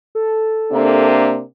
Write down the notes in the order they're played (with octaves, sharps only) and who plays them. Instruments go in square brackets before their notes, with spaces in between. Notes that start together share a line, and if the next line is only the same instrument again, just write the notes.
[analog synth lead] A4
[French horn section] C3 A#3 D4